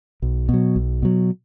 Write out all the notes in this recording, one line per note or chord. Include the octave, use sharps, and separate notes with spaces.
B1
B2 F#3
B1
B2 F#3